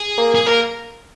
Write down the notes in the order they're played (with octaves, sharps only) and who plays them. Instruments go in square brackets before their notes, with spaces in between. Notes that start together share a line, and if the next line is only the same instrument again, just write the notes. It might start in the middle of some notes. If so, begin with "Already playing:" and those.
Already playing: [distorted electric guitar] G#4
[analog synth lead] A#3
[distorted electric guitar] G#4
[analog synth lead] A#3 [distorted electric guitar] A#4